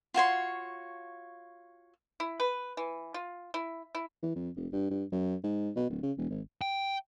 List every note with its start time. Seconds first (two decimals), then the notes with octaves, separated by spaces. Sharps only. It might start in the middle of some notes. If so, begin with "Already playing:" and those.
0.14 F4 F#4 C#5 C6
2.20 E4
2.40 B4
2.77 E3
3.14 F4
3.54 E4
3.95 E4
4.23 E3
4.35 F2
4.56 F1
4.73 G2
4.90 G2
5.12 F#2
5.43 G#2
5.76 B2
5.89 D1
6.03 C#3
6.18 E1
6.30 G#1
6.61 G5